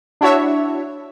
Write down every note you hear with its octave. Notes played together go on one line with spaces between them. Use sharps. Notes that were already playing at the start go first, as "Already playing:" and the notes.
D4 E4 F#4 C#5 E5